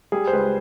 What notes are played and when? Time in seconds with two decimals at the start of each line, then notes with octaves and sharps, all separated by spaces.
0.12 G3 G#4
0.27 C5
0.33 C#2 B4